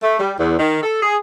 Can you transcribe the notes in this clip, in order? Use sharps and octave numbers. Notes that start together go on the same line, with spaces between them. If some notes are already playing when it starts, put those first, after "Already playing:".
A3
G3
E2
D#3
A4
G#4